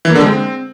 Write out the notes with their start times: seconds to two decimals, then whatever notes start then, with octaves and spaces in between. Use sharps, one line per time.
0.05 E3
0.10 A#3
0.15 D3
0.21 G#3
0.26 C4